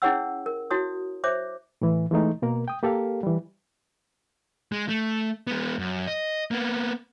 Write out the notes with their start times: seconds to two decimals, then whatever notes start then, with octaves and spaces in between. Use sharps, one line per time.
0.02 C#4 E4 G#4 C#5 F#5 E6
0.46 A#4
0.71 E4 F#4 C#5 D#6
1.24 C5 C#5 E5 D6
1.82 A2 E3
2.11 E3 G#3 A3 D#4
2.42 B2 A#3 A#4
2.68 G5 D#6
2.83 A#3 G4 A4 A#4 F5
3.23 E3 G3
4.72 G#3
4.89 A3
5.47 G#3 B3
5.79 F#2
6.07 D#5
6.51 A#3 B3